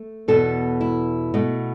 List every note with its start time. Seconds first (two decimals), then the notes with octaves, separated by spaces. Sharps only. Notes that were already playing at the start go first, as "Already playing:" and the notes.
Already playing: A3
0.28 E2 B2 B3 A4
0.81 E4
1.34 B2 A3